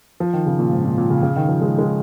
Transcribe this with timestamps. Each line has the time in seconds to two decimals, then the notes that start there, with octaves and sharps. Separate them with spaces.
0.20 F3
0.33 D#3
0.46 C#3
0.59 A#2
0.73 G#2
0.85 A#2
0.98 A#2
1.10 C#3
1.23 C#3
1.36 D#3
1.49 F3
1.61 G#3
1.78 G#3